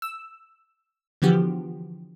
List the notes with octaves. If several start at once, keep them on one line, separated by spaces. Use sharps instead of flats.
E6
D3 E3 F3 B3 F#4 G4